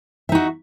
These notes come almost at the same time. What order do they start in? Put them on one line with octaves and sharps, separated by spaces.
E5 D#4 F#4